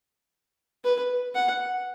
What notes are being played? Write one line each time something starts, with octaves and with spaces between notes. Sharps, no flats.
B4
F#5